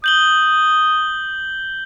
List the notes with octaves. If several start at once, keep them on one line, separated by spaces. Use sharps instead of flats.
D#6 G6 F#7 G7